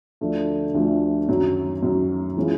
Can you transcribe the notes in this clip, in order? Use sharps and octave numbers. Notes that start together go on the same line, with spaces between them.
D2 D3 F3 A3 D4
D2 D3 F3 A3 D4
F#2 D#3 F#3
F#2 D#3 F#3
E3 G#3 C#4 F4